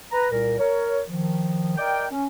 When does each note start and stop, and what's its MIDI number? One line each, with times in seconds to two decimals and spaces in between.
0.12 0.28 71
0.12 0.28 82
0.31 0.58 36
0.31 0.58 46
0.31 0.58 70
0.59 1.01 70
0.59 1.01 73
1.08 1.76 51
1.08 1.76 53
1.78 2.07 70
1.78 2.07 74
1.78 2.07 75
1.78 2.07 79
2.11 2.27 61